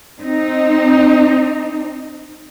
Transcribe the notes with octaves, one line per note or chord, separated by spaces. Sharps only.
C4 D#4